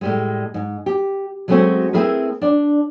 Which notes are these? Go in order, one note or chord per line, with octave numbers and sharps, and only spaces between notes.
A2 G3 G#3
G#2
G4
F#3 G#3 A3 C4 C#4 F#4
A3 C4 E4 G#4 A#4 B4
D4 D5